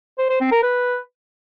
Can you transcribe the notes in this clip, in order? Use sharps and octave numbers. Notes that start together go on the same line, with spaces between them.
C5
C5
C4
A#4
B4